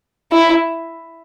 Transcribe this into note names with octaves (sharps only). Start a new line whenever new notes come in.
E4